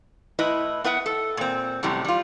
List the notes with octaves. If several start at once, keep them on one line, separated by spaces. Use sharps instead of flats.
A2 E4 B4 D#5
B3 B4 E5 F#5
A4
A#2 C4
F#2 A2 C3 G3
G3 F4